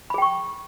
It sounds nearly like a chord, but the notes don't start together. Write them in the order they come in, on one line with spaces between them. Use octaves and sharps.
B5 G#4 G5 C#6